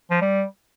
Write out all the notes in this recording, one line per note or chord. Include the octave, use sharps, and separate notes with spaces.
F3
G3